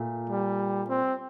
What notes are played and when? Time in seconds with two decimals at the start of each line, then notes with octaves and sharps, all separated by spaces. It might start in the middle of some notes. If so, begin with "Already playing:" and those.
Already playing: A#2 A3
0.30 G3
0.89 C4